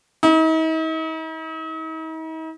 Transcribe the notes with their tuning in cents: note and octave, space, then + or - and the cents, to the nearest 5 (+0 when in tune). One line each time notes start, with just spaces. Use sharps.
D#4 +45